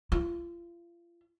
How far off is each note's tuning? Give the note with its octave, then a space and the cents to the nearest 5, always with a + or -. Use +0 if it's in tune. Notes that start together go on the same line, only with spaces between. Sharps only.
F4 -35